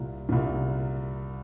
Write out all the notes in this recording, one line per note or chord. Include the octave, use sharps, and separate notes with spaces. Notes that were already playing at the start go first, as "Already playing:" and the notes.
Already playing: C2 A#2
C2 A#2